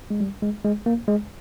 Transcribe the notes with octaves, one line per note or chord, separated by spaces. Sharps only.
G#3
G3
G#3
G#3
A#3
G#3